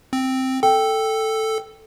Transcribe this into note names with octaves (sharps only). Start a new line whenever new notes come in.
C4
A4 G5